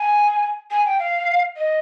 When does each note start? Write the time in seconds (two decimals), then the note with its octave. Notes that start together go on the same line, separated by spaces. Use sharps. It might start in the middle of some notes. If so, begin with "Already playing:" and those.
Already playing: G#5
0.71 G#5
0.85 G5
0.99 F5
1.56 D#5